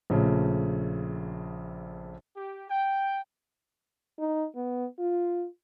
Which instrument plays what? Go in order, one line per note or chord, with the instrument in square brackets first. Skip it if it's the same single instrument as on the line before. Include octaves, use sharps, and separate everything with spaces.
[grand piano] A#1 A#2 C#3 A3
[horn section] G4
G5
[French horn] D#4
B3
F4